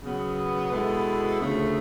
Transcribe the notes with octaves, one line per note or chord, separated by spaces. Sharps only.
C#3 F#3 B3
B2 G#3 B3 E4 A4
D2 C#3 F3 A3